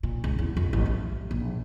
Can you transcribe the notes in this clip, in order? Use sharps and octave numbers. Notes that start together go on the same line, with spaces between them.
A#2
C#2
E2
F2
A1
A3
A#1